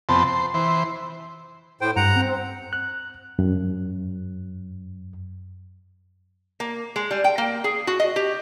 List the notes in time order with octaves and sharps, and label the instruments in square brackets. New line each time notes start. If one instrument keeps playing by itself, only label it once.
[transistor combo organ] F2 C3 B3 C4 A5
C5
E3 C5
[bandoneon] A2 C5 G5
[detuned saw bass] G2 [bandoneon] F#5 A#5
[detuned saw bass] C4
[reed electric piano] F#6
F#2
[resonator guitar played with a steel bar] A#3
G#3
G3
G5
A#3
G#4
F#4
D#5
G4